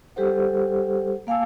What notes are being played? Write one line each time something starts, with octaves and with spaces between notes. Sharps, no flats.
G3 G4 A4 C5 F#5
A#3 F5 G#5 A5 E6